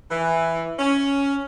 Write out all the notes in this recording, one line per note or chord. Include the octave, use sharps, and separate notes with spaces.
E3
C#4